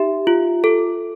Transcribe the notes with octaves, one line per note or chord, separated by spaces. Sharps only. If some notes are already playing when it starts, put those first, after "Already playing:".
Already playing: D#4 G4 E5
F4
A4